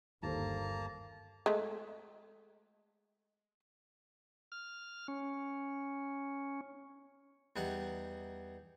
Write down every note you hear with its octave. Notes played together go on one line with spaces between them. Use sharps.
G1 D#2 A#3 A4 C5 A5 A#5
G#3 A3
F6
C#4
E2 G3 D#4 F#5